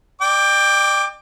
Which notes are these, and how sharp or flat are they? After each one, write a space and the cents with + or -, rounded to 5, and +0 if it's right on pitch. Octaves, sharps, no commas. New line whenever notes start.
D5 +40 G5 +20 D6 +0